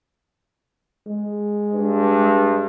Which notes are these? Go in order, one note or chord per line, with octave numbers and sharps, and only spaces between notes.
G#3
G2